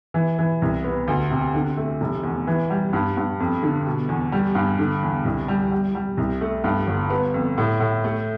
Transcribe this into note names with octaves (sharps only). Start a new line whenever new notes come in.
E3
E3
C2
B3
D2
C3
D3
A3
F1
E2
E3
G3
G2
G2
F2
D3
B2
E2
G3
G2
D3
E2
C2
G3
G3
G3
C2
A3
G2
G1
B3
F2
A2
A2
A3